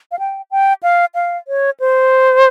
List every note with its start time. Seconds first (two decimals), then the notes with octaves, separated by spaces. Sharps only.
0.12 F5
0.19 G5
0.51 G5
0.83 F5
1.15 F5
1.48 C#5
1.80 C5